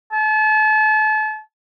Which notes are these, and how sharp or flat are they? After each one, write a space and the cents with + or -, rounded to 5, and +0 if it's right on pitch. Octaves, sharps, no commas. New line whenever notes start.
A5 -35